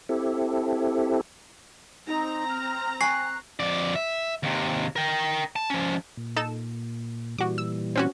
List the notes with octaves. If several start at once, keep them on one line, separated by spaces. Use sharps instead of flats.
C4 E4 G4 A4
C4 D#4 A#5
F6
G5 G#5 C#6 F#6 C7
F2 D5
E5
D#2 C3
A#4 G5
A5
F3 C#4
A#2
D#4 A4 E7
A#2 E3 G3 F#4 D6
E6
C4 C#4 F#4